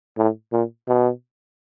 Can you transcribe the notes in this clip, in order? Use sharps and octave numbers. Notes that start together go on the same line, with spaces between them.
A2
A#2
B2